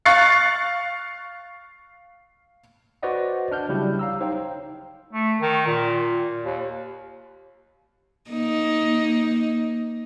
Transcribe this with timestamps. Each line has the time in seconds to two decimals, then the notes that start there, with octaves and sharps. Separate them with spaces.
0.05 F5 C#6 F#6 A6 C7 C#7
3.03 F#4 B4 C5 D5 D#5 F#5
3.51 D4 F6 G6
3.69 C#3 F#3 G3 E4 G4
3.99 F5 A#5 E6
4.20 D#4 C5 C#5 F5 G5
5.12 A3
5.41 D#3
5.67 A#2
6.44 D#2
8.31 A#3 D#4